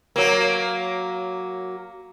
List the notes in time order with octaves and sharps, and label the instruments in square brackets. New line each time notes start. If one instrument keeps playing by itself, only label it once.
[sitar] F#3 A#3